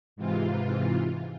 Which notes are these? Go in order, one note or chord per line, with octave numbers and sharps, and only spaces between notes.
G#2 C3 E3 F4